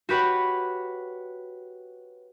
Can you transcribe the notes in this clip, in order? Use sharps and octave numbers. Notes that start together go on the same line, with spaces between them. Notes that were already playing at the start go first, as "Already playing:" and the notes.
F#4 G4 B4 C#5 F#5